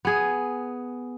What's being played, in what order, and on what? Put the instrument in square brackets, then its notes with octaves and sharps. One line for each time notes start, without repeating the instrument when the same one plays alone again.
[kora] B3 G#4